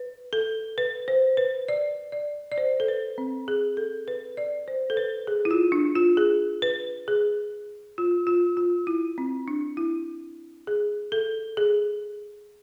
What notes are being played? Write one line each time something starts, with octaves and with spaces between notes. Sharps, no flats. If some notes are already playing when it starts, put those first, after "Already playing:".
Already playing: B4
A4
B4
C5
B4
D5
D5
D5
C5
A4
B4
C4
G#4
A4
B4
D5
C5
A4
B4
G#4
E4
F4
D4
F4
G#4
B4
G#4
F4
F4
F4
E4
C4
D4
E4
G#4
A4
G#4